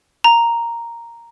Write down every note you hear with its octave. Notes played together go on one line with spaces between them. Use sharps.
A#5